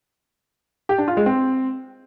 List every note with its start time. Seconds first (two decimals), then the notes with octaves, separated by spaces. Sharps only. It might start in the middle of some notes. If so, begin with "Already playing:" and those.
0.89 G4
0.98 D4
1.08 F4
1.17 G#3
1.26 C4